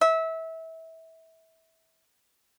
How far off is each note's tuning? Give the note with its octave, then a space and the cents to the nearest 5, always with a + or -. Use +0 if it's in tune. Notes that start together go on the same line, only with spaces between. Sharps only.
E5 -25